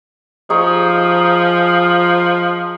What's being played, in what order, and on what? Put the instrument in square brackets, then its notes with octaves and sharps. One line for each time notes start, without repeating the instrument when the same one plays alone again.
[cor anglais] F3 [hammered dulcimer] D#4 G#4 C#6